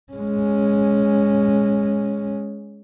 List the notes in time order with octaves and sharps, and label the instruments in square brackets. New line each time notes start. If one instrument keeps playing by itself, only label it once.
[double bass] G#3 C#4